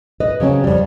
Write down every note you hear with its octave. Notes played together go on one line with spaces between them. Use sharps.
B4 D#5
C#3 F#3 C4 C#4
F2 G3